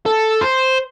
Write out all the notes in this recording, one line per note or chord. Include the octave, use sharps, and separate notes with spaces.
A4
C5